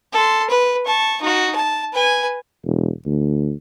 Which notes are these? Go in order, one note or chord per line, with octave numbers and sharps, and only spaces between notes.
A4 C6
B4
A5 C#6
D#4 F#4
A5
B4 G#5
E1
D2